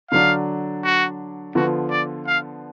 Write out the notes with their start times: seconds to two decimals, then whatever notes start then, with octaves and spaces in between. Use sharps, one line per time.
0.11 D3 F#3 D4 F5
0.84 F#4
1.55 D3 F3 B3 F4 F#4
1.91 D5
2.27 F5